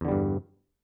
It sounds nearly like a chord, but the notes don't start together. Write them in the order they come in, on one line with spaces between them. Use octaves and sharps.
E2 D3 G3 G2